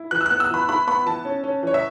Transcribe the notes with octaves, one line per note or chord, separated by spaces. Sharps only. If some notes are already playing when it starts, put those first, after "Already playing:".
Already playing: E4
E3 F#6
E6
B3 F#6
E6
E3 B5
E4 B5
B3 B5
E3 A5
C#4
C#4
E3 C#5
E5